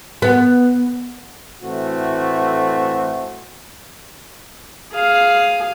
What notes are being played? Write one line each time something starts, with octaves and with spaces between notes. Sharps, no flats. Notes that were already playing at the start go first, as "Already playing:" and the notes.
B3
A2 E3 A3 C4 F#4
G#4 F5